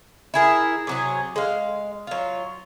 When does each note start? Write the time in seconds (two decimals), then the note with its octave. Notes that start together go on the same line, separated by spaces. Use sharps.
0.34 E4 G#4 A#4
0.87 C3 F#3 G#4
1.36 G#3 F5
2.07 F#3 F4